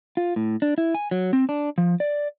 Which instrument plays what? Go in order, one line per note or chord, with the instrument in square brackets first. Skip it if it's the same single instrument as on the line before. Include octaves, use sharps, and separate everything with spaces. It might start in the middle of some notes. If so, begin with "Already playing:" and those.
[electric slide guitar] F4
A2
D4
E4
G#5
F#3
C4
D4
F3
D5